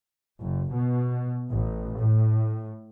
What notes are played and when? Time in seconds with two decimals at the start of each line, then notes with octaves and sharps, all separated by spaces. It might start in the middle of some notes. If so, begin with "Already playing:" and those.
0.40 F#1
0.74 B2
1.49 A1
1.97 A2